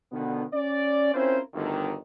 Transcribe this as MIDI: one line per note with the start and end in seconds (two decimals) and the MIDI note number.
0.12 0.43 47
0.12 0.43 50
0.12 0.43 51
0.12 0.43 53
0.12 0.43 59
0.53 1.14 61
0.53 1.14 74
1.14 1.40 60
1.14 1.40 61
1.14 1.40 64
1.14 1.40 65
1.14 1.40 70
1.14 1.40 72
1.54 1.94 31
1.54 1.94 38
1.54 1.94 51